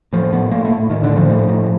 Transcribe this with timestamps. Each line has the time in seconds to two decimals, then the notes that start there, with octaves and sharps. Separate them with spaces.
0.13 A2 F3
0.33 A2 B3
0.51 A2 A#3
0.65 A3
0.70 A2
0.90 A2 D#3
1.03 D3
1.09 A2
1.16 F3
1.29 A2
1.48 A2